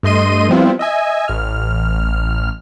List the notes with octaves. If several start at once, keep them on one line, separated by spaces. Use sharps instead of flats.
G2 A3 D#5 C6 D#7
F3 G3 B3 C4 E4 F4
D#5 E5 G#5
A1 F6